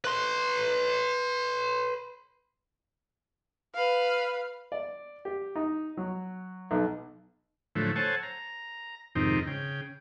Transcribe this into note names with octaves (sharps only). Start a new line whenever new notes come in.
B4 C6
B4 F5
D5
G4
D#4
F#3
B1
A2 D3 F3 F#3 A3
A4 C5 C#5 F#5 G#5 A5
A#5
F2 G#2 C3 D#3 C4 D#4
C#3 G5